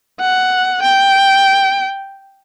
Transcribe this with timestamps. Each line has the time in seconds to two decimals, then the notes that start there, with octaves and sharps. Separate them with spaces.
0.20 F#5
0.82 G5